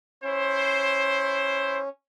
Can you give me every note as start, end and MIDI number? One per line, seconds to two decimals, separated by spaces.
0.23 1.89 61
0.23 1.79 64
0.23 1.79 72